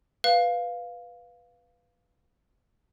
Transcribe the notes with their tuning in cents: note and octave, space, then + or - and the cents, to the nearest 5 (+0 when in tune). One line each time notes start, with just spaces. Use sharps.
B4 +0 F5 +0